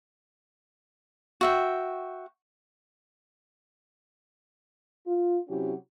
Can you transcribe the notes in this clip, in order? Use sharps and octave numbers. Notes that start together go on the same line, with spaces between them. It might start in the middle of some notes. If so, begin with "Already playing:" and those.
F#4 E5 G5
F4
C3 F#3 C#4 E4 F#4 G4